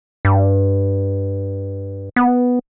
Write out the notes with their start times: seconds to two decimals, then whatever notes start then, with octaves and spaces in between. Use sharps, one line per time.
0.25 G2
2.16 B3